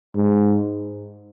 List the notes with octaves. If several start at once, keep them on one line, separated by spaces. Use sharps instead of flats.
G#2